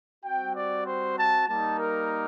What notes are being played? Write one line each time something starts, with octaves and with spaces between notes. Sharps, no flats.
G3 C4 F#4 G5
D5
C5
A5
G3 A#3 D#4 A5
A#4